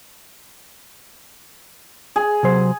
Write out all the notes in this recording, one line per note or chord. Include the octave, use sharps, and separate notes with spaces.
G#4
C3 F#3 C5